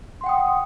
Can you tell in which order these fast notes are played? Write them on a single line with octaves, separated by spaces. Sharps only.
C6 F#5 G5 D#6